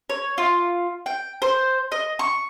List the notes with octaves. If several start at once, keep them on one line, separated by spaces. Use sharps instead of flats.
C#5
F4
G5
C5
D#5
C#6